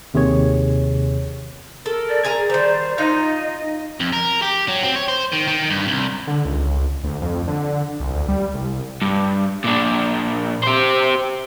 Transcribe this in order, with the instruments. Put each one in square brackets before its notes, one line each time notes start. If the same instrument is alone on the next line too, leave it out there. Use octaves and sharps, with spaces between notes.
[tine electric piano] D#2 C3 D#3 G#4 C#5
[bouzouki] A4 [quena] A#4
[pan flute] D5
[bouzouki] G#4 G#5 A#5
[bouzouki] D#3 G3 [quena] C5
[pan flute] D#4 [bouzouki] F4 [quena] D#5
[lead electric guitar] F2
A#4
G4
F#3
C4
C#5
C5
D#3
D#3
G2
C2
[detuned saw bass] D3
C#2
D2
F2
D3
C2
D2
G3
C2
[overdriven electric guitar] G2
A#2 D4
G4 C5